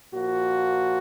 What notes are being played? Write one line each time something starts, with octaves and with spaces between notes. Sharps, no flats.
A#2 F3 A#3 F#4